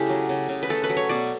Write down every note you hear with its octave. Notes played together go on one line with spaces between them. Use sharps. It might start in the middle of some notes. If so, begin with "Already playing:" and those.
Already playing: C#3 A3 E4 G4 A4
F#3
C#3
C#3
B4
A3 A4
B4
F#3
C#5
B2 D5